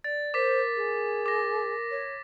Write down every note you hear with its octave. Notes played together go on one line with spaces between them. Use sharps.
D5 A6
A#4 C5 D6 B6
G#4
D6 A#6
C#5